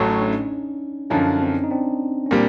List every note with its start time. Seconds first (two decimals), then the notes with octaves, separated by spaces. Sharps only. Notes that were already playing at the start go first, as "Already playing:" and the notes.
Already playing: A1 A2 F#3 A3
0.09 C#4 D#4
0.20 D4
0.29 C#4 D#4
1.10 F#2 D3 F3 C#4 D#4
1.40 C4 D4
1.64 D#4
1.70 C4 D4
2.26 C#4
2.31 A#2 G3 C4 D4